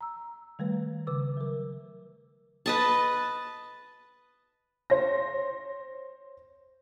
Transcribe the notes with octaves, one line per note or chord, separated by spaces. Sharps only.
A#5 E6
D#3 G3 A3 B4
C#3 B4 D6 E6
F#3 A#4
B4 D#5 A5
C5 C#5 A#6